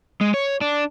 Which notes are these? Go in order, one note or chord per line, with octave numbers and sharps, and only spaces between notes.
G#3
C#5
D4